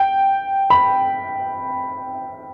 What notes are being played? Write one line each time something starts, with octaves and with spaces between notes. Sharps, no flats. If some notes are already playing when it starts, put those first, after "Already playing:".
Already playing: G5
B5